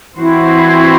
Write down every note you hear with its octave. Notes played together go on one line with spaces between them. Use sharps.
E3 C4 E4 F#4 C5